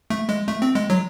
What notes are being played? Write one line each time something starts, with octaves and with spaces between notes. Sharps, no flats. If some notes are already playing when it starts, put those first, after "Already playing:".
A3
G#3
A3
C4
G#3
F#3